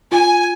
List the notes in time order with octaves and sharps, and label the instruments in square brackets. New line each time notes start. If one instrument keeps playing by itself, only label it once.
[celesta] F4 [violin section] G#5